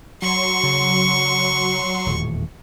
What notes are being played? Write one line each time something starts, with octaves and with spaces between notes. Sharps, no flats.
F#3 C6 C#6
C#3
D#1 E2 A2